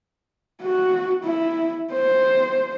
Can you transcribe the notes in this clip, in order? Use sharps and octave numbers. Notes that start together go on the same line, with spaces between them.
F#4
E4
C5